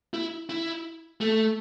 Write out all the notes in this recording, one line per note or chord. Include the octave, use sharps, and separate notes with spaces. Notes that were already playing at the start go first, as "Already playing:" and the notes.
E4
E4
A3